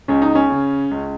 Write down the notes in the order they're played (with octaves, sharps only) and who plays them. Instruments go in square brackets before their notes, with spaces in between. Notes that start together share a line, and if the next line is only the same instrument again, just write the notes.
[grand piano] C#2 C#4
D#4
C#4
C#3
C#2